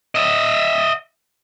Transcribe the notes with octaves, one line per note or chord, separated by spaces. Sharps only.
D#5 E5